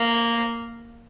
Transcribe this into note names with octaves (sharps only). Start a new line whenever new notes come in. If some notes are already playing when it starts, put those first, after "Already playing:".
Already playing: A#3